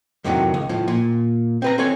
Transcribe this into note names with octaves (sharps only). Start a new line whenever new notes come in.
F2 A2 C3 D#3 E3 F#3
C#2
A2 F3
A#2
C4 B4 A#5
C4 A4 C#5 G#5